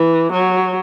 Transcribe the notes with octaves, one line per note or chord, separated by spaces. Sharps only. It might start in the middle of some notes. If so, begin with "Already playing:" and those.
Already playing: E3
F#3